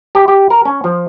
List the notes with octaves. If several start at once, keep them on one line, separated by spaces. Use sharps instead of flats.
G4
G4
A#4
C#4
F3